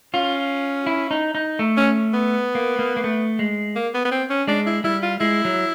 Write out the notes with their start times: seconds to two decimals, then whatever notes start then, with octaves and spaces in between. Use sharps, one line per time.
0.14 C#4 F4
0.87 E4
1.11 D#4
1.35 D#4
1.59 A3
1.77 C#4
2.13 B3
2.55 A#3
2.79 A#3
2.97 A#3
3.04 A3
3.39 G#3
3.75 A#3
3.94 B3
4.05 B3
4.11 C4
4.30 C#4
4.47 G#3 D4
4.66 E4
4.84 G3 E4
5.02 F4
5.20 G#3 E4
5.45 F#3